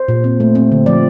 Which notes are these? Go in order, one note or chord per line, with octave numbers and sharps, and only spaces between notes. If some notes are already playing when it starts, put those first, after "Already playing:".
Already playing: C5
A#2
C4
A3
C4
D3
F3 D5